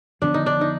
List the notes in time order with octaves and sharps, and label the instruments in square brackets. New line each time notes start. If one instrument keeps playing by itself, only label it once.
[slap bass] F2 D3 F3 B3 [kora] D4
[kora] D#4
D4
D#4